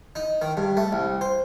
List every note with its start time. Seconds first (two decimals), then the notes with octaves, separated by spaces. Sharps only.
0.15 D#4
0.42 D#3
0.57 G2
0.77 A3
0.92 C2
1.21 C5